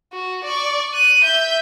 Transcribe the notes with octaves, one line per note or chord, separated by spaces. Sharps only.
F#4
D5 C#6
F#6 D#7
E5 G6